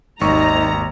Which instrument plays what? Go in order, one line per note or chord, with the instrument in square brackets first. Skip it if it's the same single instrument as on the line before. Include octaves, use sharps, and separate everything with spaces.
[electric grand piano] G#1 C#6 [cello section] D#2 D#3 [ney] D#4 [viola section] A#5